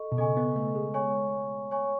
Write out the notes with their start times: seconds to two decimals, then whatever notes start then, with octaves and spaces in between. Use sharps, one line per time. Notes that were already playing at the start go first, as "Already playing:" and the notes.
Already playing: A4 D#5 C#6
0.12 B2
0.17 C#3 A4 D#5 G#5 C#6
0.37 B3
0.56 A3
0.75 G#3
0.94 C#5 G#5 C#6
1.71 C#5 G#5 C#6